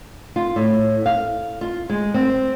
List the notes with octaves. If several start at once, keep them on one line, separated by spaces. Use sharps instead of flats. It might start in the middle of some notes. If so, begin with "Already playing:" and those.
F4
A2
F5
F4
G#3
C4